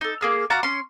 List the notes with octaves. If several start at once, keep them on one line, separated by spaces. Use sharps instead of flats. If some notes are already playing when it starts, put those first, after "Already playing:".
D#4 A4
A#3 G#4 F6
F#4 D5 F5 A#5
C#4 C6